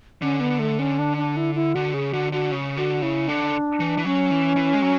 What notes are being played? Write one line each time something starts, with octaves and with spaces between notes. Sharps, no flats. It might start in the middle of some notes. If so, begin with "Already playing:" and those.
D3 C#4
B3
A3
C#4
D4
D4
E4
E4
D3 F#4
C#3 G#4
D3 F#4
D3 F#4
C#3
D3 F#4
C#3 E4
D3 D4
E3
E3
F#3 C#4
E3
E3
G#3
F#3